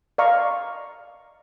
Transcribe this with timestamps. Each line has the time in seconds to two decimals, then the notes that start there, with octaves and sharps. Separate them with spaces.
0.18 D5 D#5 F5 A#5 C#6